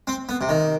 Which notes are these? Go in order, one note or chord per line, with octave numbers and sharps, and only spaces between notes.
C4
B3
C3
D#3